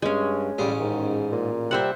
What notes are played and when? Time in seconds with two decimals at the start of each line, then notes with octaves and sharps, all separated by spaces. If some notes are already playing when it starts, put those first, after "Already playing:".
0.02 G2 G#3 C#4
0.58 A1 C#3 G3 G#4
0.80 G#2 D#3
1.32 A#2
1.71 C3 G3 C4 C5 E5 F#5